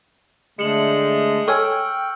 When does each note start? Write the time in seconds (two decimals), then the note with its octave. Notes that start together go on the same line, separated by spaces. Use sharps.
0.59 D3 G#3 A3 C#7 F#7
1.48 A4 C#5 G5 G#5 C#6 E6 F6